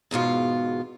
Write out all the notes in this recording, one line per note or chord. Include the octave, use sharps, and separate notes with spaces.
E2 G#2 B2 F4